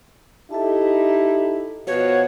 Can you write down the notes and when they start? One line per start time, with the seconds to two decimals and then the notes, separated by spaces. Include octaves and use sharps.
0.51 D#4 E4 G4 A4 E5 A5
1.87 B2 F3 F#4 B4 C#5